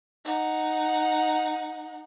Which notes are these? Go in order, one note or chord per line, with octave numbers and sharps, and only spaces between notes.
D#4 F#5